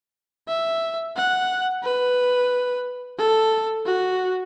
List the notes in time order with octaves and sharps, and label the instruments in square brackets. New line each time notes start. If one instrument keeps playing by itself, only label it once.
[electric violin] E5
F#5
B4
A4
F#4